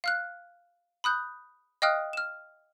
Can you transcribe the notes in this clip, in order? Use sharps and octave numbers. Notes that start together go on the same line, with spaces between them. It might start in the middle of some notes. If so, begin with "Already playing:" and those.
F5 F6 F#6
B5 D#6 F#6 G6
D#5 F5 G5 D#6 F6 F#6
F6 E7